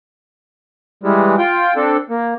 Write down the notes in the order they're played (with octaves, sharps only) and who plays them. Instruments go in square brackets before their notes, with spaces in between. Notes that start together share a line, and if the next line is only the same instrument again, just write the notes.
[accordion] E3 G3 G#3
F4 G5
C4 D4 A4
A#3